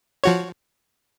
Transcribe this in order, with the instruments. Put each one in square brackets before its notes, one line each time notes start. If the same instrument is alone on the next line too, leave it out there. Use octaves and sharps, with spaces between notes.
[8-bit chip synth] F3 F#4 C#5